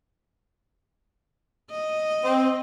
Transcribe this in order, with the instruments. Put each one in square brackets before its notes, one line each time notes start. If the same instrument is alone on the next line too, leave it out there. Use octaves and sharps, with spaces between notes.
[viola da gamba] D#5
[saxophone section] C4